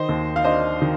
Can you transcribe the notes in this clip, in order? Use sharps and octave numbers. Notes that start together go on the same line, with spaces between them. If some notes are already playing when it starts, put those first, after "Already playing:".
Already playing: D#3 C5 D#5
D#2
F5
D4 C5 D#5
D#3